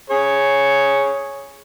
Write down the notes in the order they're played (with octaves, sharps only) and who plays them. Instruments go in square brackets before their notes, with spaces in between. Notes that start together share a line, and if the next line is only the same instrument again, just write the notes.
[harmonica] G#4 C#5